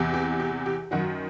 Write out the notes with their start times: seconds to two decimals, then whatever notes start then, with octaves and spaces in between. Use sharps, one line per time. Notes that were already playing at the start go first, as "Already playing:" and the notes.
Already playing: E2 C3 E3
0.14 G4
0.40 G4
0.66 G4
0.91 F#2 D#3 F#3 F#4